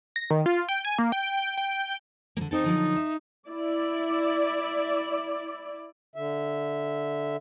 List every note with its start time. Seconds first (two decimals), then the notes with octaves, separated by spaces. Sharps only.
0.16 A#6
0.30 D#3
0.46 F4
0.69 G5
0.85 G#5
0.99 A#3
1.12 G5
1.57 G5
2.37 D3 A#3
2.51 C4 D#4 A4
2.64 D3 F3 F#3
2.96 E5
3.48 E4 D5
6.15 D3 E5